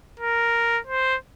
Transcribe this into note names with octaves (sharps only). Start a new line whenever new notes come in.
A#4
C5